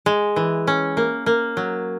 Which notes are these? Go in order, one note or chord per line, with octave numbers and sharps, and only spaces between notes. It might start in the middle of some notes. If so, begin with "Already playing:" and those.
G#3
E3
C#4
A#3
A#3
F#3